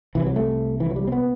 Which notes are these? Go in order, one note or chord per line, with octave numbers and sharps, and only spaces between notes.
C2 C3 E3
F#3
A3
E3
F#3
G3
C4
B3